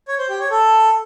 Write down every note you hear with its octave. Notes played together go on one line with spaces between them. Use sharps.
C#5
C5
G4
C#5
A4